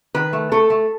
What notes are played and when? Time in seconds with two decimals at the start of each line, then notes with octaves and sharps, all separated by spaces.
0.15 D#3 B4
0.33 A3
0.52 A3 A4
0.70 A3